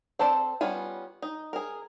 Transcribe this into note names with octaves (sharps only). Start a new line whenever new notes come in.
C4 A4 C5 D5
G3 B3 C#4 F4 G#5
D#4
G#4 A#4